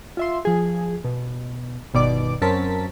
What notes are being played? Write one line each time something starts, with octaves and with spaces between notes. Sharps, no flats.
F4 E5 C6
F3 G#4
B2
G1 B2 D#3 D5 D6
F#2 C4 C#4 A#4 A5 B6